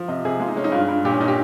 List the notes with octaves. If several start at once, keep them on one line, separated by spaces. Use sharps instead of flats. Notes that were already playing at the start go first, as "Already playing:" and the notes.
Already playing: F3
C3 D#5
C3 G#4
G#3 F4
D#4
G#3 C#4
D#4
G2 F4
G2
A#2 G4
C#4
A#2 D#4
G4